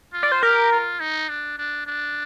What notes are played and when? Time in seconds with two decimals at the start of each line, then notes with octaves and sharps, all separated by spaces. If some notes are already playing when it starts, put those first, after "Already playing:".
0.13 F4
0.23 D5
0.32 C5
0.42 G4 A#4
0.72 F4
1.00 D#4
1.29 D4
1.58 D4
1.87 D4